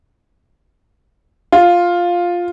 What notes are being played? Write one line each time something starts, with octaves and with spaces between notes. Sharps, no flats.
F4